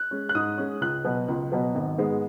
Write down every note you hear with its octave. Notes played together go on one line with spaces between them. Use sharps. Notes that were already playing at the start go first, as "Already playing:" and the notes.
Already playing: F#6
G#3 C#4
F#6
G#2 D#6
G#3 C#4
C#2 F#6
B2 F#3 B3
C#2
B2 F#3 B3
G#1
G#2 G#3 B3